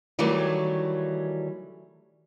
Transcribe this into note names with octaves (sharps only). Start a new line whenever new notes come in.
D#3 E3 F#3 G3 A3